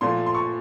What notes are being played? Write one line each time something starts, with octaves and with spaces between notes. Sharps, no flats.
A#2 F3 A3 C6
C6
C#6